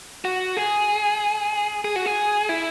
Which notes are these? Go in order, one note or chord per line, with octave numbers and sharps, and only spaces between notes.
F#4
G#4
G#4
F#4
G#4
E4